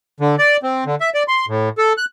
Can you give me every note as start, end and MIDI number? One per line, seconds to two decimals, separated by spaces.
0.20 0.35 50
0.39 0.57 74
0.63 0.84 60
0.86 0.95 50
1.01 1.10 76
1.14 1.23 74
1.28 1.46 84
1.48 1.69 45
1.78 1.93 69
1.97 2.05 90